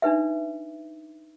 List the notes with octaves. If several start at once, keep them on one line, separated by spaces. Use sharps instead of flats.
D4 D#4 B4 E5